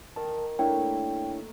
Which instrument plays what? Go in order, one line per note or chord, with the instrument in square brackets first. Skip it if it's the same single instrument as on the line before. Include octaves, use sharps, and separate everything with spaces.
[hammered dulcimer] D#3 [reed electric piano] A#4 A5
[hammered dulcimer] A3 A#3 [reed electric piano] D4 E4 C#5 [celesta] G5